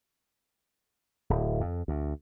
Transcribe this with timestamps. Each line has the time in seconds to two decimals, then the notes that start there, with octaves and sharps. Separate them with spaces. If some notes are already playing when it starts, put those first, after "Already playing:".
1.30 D1
1.61 F2
1.88 D2